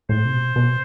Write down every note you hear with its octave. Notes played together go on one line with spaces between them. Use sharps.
A2 C5
C3
B2
B2